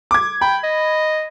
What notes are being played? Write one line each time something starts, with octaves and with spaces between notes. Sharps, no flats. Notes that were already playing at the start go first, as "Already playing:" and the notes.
D6 G#6
G5 B5
D#5